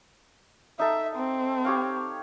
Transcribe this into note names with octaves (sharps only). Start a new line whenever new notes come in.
D#4 A4 E5
C4
G4 C#5 F5